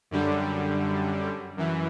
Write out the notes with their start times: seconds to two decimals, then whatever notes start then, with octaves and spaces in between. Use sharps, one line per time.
0.11 F#2 D3 G3
1.57 F#2 E3